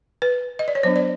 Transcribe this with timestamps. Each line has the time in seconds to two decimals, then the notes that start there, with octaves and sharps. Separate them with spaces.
0.22 B4
0.59 D#5
0.68 D5
0.75 C#5
0.83 F#3 B3 D4 C5
0.96 D5